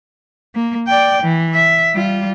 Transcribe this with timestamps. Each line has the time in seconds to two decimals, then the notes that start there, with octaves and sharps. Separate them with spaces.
0.55 A#3
0.87 D5 G5
1.23 E3
1.54 E5
1.94 G3 F4